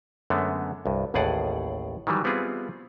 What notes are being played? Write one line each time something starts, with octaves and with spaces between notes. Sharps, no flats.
F#2 D3 G#3 A3 B3
C2 G2
A1 D#2 A2 G#4 D5 F#5
D#3 E3 F#3 G3
G3 B3 C4 E4 F4 G#4